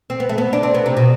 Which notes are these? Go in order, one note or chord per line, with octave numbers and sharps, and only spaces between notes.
C4
B3
A3
B3
D4
C4
B3
C3
B2